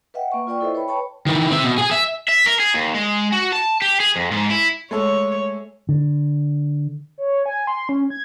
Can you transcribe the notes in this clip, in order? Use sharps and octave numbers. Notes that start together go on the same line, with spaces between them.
B4 D#5 E5 F#5 G5
A#3 C#6
F4 B4 D5 G5 C#6
E4 A4 B4 C5 D#5 E5
B4 C#5 G5 B5
C#5 G5 A5 B5 C#6
D#3 E3
C4 E5
B2
G#4 G#5
E5
E5
A#4
G#4
D#2
G#3
F#4
A5
G4
G#4
F2
G#2
E4
G#3 A3 A4 C#5
D3
C#5
G#5
C6
C#4
G#6